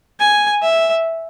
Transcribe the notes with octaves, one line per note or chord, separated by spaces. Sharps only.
G#5
E5